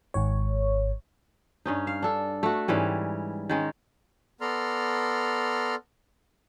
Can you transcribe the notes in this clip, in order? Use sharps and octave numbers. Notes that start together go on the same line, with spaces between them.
G#1 G#2 C#5
G2 C#4 D#4
F5
D4 A4
A3 F#4
G#2 E3 G3 C#4
D#3 G#3 C#4
B3 A4 D5 A#5 C6 F6